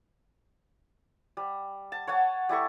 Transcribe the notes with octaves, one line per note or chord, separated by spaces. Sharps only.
G3
A5
C#5 F#5 G#5 A5
G3 E4 A4 C#6